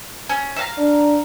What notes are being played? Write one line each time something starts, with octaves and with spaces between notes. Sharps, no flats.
C#4
E5 F5 A#5
D4